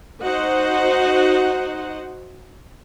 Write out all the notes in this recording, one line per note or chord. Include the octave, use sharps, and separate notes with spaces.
D#4 F#4 C5 D#5 F#5